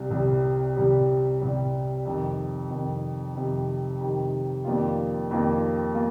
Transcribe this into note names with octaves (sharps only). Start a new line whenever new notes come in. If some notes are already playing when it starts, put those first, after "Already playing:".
Already playing: C2 C3 G3
C2 C3 G3
C2 C3 G3
C2 C3 G3
F2 C3 D#3
F2 C3 D#3
F2 C3 D#3
F2 C3 D#3
F2 D#3 G3 A#3 F4
F2 D#3 G3 A#3 F4
A#3 F4